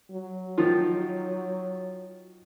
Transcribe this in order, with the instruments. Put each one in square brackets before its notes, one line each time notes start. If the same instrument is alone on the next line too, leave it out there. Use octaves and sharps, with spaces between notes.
[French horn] F#3
[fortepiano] D#3 F3 F4